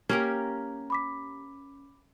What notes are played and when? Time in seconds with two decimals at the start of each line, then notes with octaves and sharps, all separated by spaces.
0.09 A#3 C#4 G4 A#4
0.90 B5 D6 B6